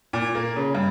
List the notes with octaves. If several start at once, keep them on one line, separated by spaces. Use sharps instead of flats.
A#2
A#3
C#3
G2